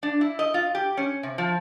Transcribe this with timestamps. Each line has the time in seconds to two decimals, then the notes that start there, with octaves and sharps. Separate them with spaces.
0.03 D4
0.21 E4
0.39 D#5
0.54 F4
0.75 G4
0.97 C#4
1.23 C3
1.38 F3